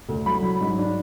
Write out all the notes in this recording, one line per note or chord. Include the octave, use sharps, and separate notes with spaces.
D2
F#3 B5
F#3
G#2
D4